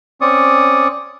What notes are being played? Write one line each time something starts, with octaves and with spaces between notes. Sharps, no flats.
C4 C#4 D5 C#6 D#6